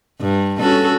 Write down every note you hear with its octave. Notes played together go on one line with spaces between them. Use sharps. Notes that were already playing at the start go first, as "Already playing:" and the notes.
G2
C#4 F#4 A4